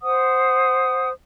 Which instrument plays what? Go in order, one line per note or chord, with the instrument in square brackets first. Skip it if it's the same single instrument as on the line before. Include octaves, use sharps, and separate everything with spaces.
[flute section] C5 F#5 D#6